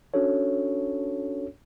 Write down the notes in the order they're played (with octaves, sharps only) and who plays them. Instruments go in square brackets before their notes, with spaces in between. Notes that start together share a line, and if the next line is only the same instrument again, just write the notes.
[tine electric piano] C#4 D4 F#4 A4 C#5